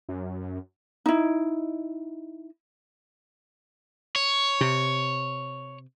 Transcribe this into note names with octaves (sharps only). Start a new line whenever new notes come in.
F#2
D#4 E4
C#5
C3